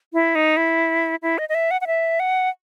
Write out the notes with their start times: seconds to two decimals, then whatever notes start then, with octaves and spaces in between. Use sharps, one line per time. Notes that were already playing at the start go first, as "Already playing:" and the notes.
0.13 E4
0.35 D#4
0.57 E4
1.22 E4
1.38 D#5
1.49 D#5
1.55 E5
1.71 F#5
1.81 F#5
1.87 E5
2.20 F#5